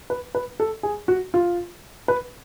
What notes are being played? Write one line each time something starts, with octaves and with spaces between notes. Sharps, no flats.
B4
B4
A4
G#4
F#4
F4
B4